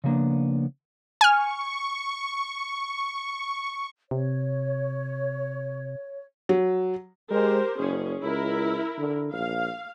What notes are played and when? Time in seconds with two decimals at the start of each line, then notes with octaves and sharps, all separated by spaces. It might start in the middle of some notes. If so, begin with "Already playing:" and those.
0.04 C#3 F3 G3 A#3 B3 D4
1.21 G#5 C#6 F6
4.11 C3 C#5
6.49 F#3
7.31 G#3 G4 A#4 C5
7.78 F#1 C#4 G#4
8.23 C#2 E4 A#4
8.98 D3
9.33 A#1 F5